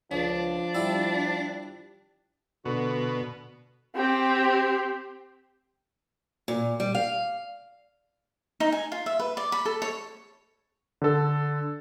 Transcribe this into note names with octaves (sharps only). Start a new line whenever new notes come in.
C#2 F3 D4
G3 E4
B2 D3 F#4
C4 G4
A#2
G3
F5
D#4
G#5
F4
E5
B4
D5
B5
A4
C#5
D3 A4